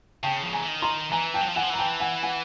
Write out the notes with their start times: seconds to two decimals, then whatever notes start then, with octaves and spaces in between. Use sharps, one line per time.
0.23 C#3 G5 A5
0.43 F3
0.53 E3 G#5 A#5
0.68 D#3
0.82 A#5 C6
1.12 E3 G#5 A#5
1.34 G5 A5
1.41 F#3
1.48 F3
1.55 E3 F#5 G#5
1.63 F3
1.70 E3 A#5
1.78 G5 A5
2.00 F#5 G#5
2.22 F#5 G#5